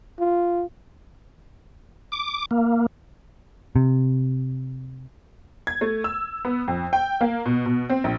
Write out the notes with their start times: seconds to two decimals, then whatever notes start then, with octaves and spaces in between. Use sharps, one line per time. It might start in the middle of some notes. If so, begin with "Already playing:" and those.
0.19 F4
2.12 D6
2.51 A#3
3.76 C3
5.67 G#6
5.81 A3
6.04 E6
6.45 B3
6.68 F2
6.93 G5
7.21 A#3
7.46 B2
7.66 B2
7.90 C4
8.04 A#1